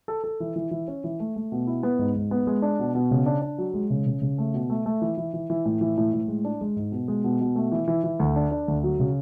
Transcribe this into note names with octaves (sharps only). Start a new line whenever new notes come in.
A4
A4
E3
E3
E3
C#4
E3
A3
A3
B2
E4
B3
G#2
G#2
B3
G#3
D4
B2
B2
C#3
D4
D4
F#3
G#3
C#3
C#3
C#3
A3
B2
A3
A3
E3
E3
E3
E3
A2
E3
A2
A2
G#3
D4
G#3
G#2
B2
G#3
B2
B2
A3
E3
E3
E3
D2
D4
D4
D2
F#3
C#3